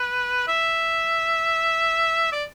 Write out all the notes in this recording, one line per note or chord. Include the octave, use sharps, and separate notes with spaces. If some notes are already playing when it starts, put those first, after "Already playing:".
Already playing: B4
E5
D5